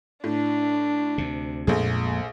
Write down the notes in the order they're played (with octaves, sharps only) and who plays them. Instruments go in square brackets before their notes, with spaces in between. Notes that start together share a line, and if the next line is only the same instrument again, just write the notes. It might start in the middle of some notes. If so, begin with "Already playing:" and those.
[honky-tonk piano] A2 [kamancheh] D4
[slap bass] D2 C3
[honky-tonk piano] A#1 A3 G#4 [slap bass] F2 A#2 G#3